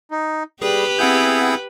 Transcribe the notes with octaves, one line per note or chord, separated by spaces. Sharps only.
D#4
G3 G4 G#4 B4
B3 C4 E4 G#4 F#5 G6